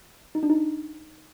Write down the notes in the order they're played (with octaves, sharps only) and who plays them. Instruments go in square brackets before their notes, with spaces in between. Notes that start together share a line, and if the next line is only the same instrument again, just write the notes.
[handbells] D#4
D4
D#4